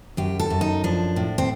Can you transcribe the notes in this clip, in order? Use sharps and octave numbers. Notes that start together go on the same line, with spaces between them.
F#2 G4
A4
F#2
D#4
F3 D4
A2
C4